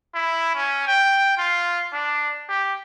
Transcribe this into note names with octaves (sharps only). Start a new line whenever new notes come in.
E4
C#4
G5
F4
D4
G4